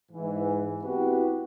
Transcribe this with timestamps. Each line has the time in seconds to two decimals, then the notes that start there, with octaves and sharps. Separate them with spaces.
0.12 G#2 E3
0.83 B3 C4 E4 F#4 G4 B4